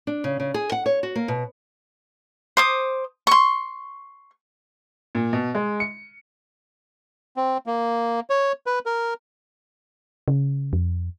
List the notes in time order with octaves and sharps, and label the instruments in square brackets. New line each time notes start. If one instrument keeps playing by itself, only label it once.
[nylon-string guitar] D4
C#3
C#3
G#4
F#5
C#5
F#4
A#3
B2
[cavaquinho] C5 D6 D#6
C6 C#6
[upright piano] A#2
B2
G#3
C#7
[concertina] C4
A#3
C#5
B4
A#4
[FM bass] C#3
F2